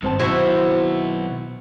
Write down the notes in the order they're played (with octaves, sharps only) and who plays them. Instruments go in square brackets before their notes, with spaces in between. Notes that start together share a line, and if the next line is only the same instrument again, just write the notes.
[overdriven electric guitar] G2 [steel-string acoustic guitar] D#3 C4 A5
[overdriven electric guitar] B1 B3 [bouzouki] E4 F#4 C5